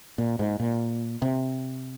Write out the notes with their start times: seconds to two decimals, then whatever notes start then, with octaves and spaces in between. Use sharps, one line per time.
0.18 A#2
0.39 G#2
0.60 A#2
1.22 C3